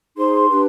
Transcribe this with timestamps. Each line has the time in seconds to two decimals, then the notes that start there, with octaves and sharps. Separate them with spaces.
0.16 D#4 G#4 C5 C6
0.49 D4 G4 B4